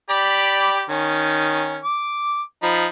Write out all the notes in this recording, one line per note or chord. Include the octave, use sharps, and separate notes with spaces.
G4 D5 B5
D#3 C#4
D6
F3 D#4 B5